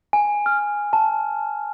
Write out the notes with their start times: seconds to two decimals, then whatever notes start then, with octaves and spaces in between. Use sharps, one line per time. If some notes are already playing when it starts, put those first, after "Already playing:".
0.13 G#5
0.46 F6
0.93 A5